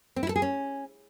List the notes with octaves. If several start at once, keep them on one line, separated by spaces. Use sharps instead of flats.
C4
E4
A4
G#4
C#4